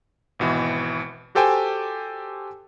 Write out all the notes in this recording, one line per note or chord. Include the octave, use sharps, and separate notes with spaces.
G#1 B2 E3
F#4 G4 A4 C5 G5 G#5